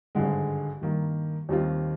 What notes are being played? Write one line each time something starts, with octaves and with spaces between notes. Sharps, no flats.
G#1 G2 D3 G#3
G2 D#3 A#3
D#2 D#3 G3 C4 F4